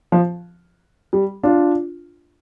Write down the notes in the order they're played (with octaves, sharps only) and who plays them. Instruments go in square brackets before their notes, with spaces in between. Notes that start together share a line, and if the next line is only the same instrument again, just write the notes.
[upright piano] F3
G3
D4 F4